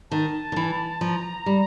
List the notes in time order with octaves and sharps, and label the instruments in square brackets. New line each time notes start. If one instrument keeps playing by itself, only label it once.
[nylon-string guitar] D#3 [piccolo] A5
[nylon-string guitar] D#3
E3
[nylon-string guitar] F3 [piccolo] A#5
[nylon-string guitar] G3